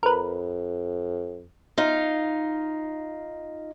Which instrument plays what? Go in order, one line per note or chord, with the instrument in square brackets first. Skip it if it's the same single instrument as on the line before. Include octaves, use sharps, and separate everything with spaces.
[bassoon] F2 [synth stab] A#4 B4
[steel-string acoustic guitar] D#4 F4 F5